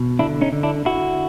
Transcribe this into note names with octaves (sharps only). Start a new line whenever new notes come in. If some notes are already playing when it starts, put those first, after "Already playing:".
Already playing: B2
D3 D4 E4
C#4 D#4
D3
D4 E4
D3 E4 F#4